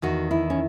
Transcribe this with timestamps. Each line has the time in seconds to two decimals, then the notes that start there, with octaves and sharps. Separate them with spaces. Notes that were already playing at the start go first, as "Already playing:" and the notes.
0.02 E2 D#3 F#4
0.31 E4
0.50 C#4